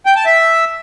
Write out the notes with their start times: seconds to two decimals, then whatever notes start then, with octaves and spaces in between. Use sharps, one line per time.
0.06 G5
0.16 A5
0.26 E5